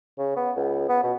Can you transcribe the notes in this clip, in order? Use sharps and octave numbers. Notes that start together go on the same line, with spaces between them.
C#3
B3
C#2
B3
B2